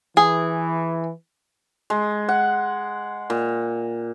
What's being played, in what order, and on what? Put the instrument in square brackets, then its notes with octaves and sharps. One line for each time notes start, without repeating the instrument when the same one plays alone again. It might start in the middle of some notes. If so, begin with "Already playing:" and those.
[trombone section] E3 [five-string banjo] G#4
[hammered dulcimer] G#3
F#5
A#2